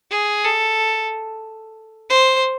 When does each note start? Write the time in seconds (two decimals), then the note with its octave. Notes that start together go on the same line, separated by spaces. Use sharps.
0.11 G#4
0.44 A4
2.10 C5